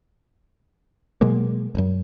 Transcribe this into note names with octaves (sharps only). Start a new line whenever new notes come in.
B2 F#3 G#3 A#3
D#1 F#2